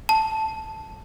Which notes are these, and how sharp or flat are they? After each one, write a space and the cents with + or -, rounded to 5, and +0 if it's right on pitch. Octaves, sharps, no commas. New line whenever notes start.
A5 +0